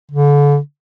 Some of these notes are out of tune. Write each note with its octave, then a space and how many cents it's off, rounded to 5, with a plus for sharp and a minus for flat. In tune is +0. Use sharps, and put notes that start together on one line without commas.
D3 -35